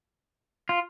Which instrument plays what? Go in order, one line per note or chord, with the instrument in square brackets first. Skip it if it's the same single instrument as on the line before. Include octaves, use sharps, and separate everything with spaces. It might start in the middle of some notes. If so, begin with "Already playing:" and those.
[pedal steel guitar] F4